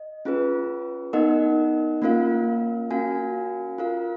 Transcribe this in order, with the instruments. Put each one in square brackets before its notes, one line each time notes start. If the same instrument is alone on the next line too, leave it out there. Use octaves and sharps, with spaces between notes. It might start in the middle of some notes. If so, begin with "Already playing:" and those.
Already playing: [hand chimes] D#5
C#4 F4 G#4 B4
B3 D#4 A#4 D#5 F#5
A#3 C#4 F4 A#4 F5
C#4 F#4 A#4 F5 G#5
F4 A#4 F5